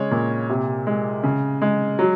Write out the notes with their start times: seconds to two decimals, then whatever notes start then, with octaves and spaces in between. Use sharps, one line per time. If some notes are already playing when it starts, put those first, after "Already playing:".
Already playing: C#3 G#3 C#5
0.11 A#2
0.49 C3
0.87 G#3
1.23 C#3
1.62 G#3
1.99 F#3